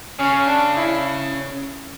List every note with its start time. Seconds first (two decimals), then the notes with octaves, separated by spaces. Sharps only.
0.19 C#3 C#4
0.47 D4
0.76 E4